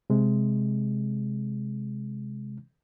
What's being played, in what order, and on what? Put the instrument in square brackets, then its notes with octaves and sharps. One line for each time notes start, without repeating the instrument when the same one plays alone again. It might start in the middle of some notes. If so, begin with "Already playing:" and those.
[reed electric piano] C3 G#3